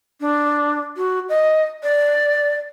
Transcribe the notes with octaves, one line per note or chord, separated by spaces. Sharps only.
D4
F#4
D#5
D5